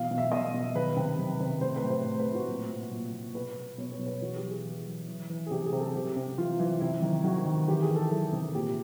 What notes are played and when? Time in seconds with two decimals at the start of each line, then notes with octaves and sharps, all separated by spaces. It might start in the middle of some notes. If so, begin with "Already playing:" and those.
Already playing: B2 E3 F5
0.11 B2
0.18 E5
0.32 B2 D#5
0.54 B2
0.75 D#3 B4
0.97 C3
1.19 D#3
1.40 C3
1.61 A2 C5
1.76 B4
1.84 A2
1.90 C5
2.04 A2
2.20 B4
2.26 A2
2.34 F#4
2.48 A#2
2.71 A#2
2.91 A#2
3.13 A#2
3.34 B2 B4
3.56 B2
3.78 B2 C#5
3.92 C#5
3.99 B2
4.06 B4
4.21 E3 F#4
4.36 G4
4.43 E3
4.50 G#4
4.65 E3
4.87 E3
5.08 E3
5.30 E3
5.46 G#4
5.51 C3 G4
5.66 G#4
5.72 C3
5.80 A4
5.95 C3 G4
6.16 C3
6.38 E3 F4
6.60 E3
6.80 C3 E4
7.02 D#3
7.24 D#3 F#4
7.46 D#3
7.68 E3 G4
7.82 G#4
7.90 E3
7.96 A4
8.11 E3 A4
8.32 C3
8.54 A#2 G4